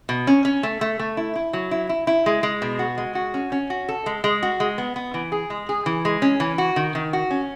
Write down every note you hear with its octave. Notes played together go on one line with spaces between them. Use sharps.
B2
C#4
C#4
A3
A3
A3
E4
E4
F#3
E4
E4
E4
G#3
G#3
B2
F#4
G#3
F#4
C#4
C#4
F#4
A4
G#3
G#3
F#4
G#3
B3
B3
E3
G#4
G#3
G#4
E3
G#3
C#4
E3
F#4
D#3
D#3
F#4
C#4